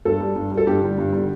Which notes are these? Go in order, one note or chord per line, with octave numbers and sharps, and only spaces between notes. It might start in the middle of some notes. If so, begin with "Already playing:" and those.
G2 A4
G3
G2
G3
A4
G2 G4
D3 G3
G2
D3 G3